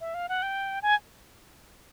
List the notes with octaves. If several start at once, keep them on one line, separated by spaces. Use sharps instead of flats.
E5
F5
F#5
G5
G#5